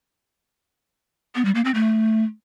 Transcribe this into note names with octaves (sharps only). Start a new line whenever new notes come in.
B3
G3
A#3
C4
A3